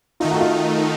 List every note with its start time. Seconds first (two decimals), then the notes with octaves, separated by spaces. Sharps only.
0.20 D#3 A3 D#4 F4
0.31 F#4
0.40 F4